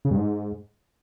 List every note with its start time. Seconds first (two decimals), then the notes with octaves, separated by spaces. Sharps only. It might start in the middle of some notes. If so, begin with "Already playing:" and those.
0.05 C#3
0.11 G2
0.17 G#2